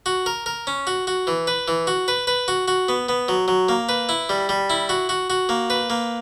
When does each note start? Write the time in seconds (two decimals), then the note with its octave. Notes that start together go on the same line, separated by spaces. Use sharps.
0.06 F#4
0.26 A#4
0.46 A#4
0.67 C#4
0.87 F#4
1.07 F#4
1.27 E3
1.47 B4
1.68 E3
1.87 F#4
2.08 B4
2.27 B4
2.48 F#4
2.68 F#4
2.89 B3
3.09 B3
3.28 F#3
3.48 F#3
3.69 A#3
3.89 B4
4.09 E4
4.29 G3
4.49 G3
4.70 E4
4.89 F#4
5.09 F#4
5.30 F#4
5.49 A#3
5.70 B4
5.90 A#3